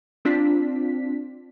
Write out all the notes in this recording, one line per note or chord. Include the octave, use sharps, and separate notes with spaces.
C4 D4 F4 B6